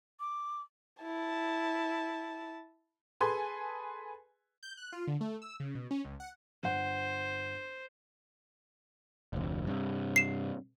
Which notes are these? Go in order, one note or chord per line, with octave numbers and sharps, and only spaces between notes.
D6
E4 A5
G#4 A4 B4 G#5 C6
G6
F#6
F4
D3
A3
E6
C#3
B2
C#4
C#2
F#5
G1 C5 F#5
F1 D2
G2 C3
C7 E7